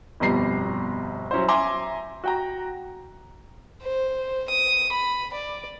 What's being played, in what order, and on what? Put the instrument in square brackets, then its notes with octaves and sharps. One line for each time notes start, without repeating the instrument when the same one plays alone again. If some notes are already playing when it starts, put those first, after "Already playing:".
[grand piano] G1 F2 B2 G3 A#5 C7
F#3 C#4 E4 C5
E5 G#5 A#5 C6 D6
F#4 G5 A#5
[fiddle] C5
D#6
B5
D5